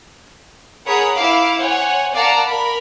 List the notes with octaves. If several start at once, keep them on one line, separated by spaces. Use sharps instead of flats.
G#4 A#4 C#5 F#5 B5 D#6
E4 F5 D6
C5 C#5 F#5 G#5
A#4 D5 F5 F#5 A5 A#5
A#4 B5